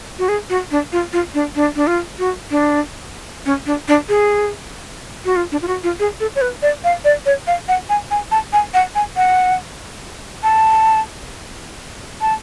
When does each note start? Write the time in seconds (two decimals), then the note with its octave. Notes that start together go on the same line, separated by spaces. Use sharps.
0.19 F#4
0.29 G#4
0.50 F#4
0.71 D4
0.92 F4
1.13 F4
1.34 D4
1.55 D4
1.76 D4
1.87 F4
2.19 F#4
2.51 D4
3.46 C#4
3.66 D4
3.88 D4
4.09 G#4
5.25 F#4
5.36 F4
5.52 D4
5.62 F4
5.68 F#4
5.84 F4
6.00 G#4
6.20 A4
6.35 C#5
6.41 B4
6.62 D5
6.84 F5
7.05 D5
7.26 C#5
7.47 F5
7.68 F#5
7.89 G#5
8.11 G#5
8.31 A5
8.53 G#5
8.74 F#5
8.95 G#5
9.16 F#5
10.43 A5
12.21 A5